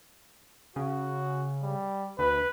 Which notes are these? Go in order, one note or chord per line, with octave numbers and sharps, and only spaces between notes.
C#3 F#4
G3
D2 B4